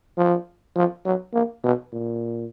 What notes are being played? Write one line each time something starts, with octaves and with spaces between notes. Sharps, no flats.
F3
F3
F#3
A#3
B2
A#2